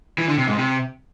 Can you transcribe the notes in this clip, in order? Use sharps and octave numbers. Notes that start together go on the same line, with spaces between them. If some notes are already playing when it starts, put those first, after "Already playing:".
E3
D3
C3
G#2
C3